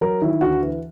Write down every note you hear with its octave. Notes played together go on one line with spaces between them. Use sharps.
F#3 A#4
D#3 E4
D2 F#4
E3